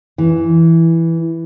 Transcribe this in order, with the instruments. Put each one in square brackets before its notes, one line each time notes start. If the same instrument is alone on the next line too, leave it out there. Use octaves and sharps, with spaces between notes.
[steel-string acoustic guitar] E3